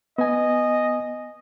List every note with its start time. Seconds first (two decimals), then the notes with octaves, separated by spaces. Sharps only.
0.18 B3 D#5 G#5